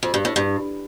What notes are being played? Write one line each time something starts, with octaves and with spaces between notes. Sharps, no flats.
F2
G2
A2
G2